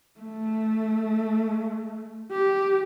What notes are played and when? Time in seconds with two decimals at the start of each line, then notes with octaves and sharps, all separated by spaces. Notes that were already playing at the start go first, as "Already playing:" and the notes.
0.20 A3
2.33 G4